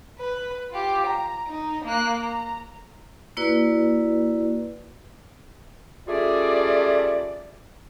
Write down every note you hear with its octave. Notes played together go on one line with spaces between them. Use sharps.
B4
F4 G4
A#5
D#4
A#3 F#6
A#5
A#3 E4 F#4 B4 D5
G3 A3 C#4 F4 G#4 D5